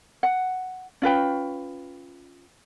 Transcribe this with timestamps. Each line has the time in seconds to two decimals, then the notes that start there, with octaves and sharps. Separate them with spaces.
0.23 F#5
1.02 C#4 F4 B4 G5